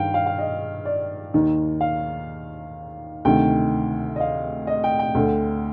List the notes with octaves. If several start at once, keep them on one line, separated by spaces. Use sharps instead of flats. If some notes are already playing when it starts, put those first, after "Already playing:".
Already playing: G2 D#3 F5 G5
F5
F5
D#5
D5
D#2 D#3
F5
D2 C3 D#3 G5
D#5
F5
D#5
G5
G5
D2 D3